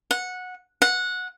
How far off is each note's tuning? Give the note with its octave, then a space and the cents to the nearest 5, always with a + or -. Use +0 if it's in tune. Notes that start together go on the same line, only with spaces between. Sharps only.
F#5 -15
F#5 -15